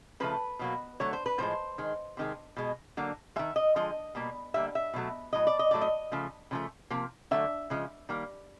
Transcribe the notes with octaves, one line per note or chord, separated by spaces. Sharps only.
C#3 F3 A3 B4
B2 F#3 A#3
D3 F#3 A3 C#5
C5
B4
A2 F3 G#3 C5
D#3 G#3
C3 D#3 G#3
B2 G#3
D3 F#3 A#3
D#3 G#3 E5
D#5
D3 F3 G#3 D#5
B2 G3 A#3
D3 G3 A#3 E5
E5
B2 F#3 A3
A2 F#3 D#5
D5
D#5
A2 F#3 A3 D5
D#5
C#3 F3 A3
C#3 F3 A3
C3 F3 A#3
D3 F#3 A3 E5
C#3 F3 G#3
D#3 G3 A#3